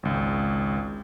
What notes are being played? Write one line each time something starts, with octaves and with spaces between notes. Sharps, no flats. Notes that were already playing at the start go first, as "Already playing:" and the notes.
G#1 C#2